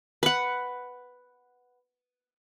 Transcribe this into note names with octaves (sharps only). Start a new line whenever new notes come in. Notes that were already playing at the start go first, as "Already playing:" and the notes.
B4 F#5